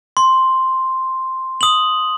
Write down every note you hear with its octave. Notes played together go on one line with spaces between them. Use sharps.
C6
D#6 F#7